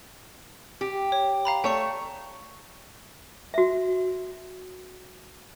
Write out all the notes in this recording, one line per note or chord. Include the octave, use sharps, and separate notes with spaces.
G4
C#5
F5 A#5 B5
A3 C#5 G5 C#6
F#4 E5